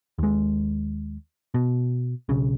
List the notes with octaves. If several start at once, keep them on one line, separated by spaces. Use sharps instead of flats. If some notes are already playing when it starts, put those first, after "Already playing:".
D#2 G#3
B2
B1 C#3